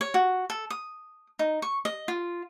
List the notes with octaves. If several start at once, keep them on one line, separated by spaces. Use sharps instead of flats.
C#5
F#4
A4
D#6
D#4
C#6
D#5
F4